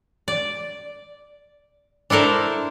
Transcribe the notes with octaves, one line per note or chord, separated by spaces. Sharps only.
D5
D4 E4 A4 A#4 C5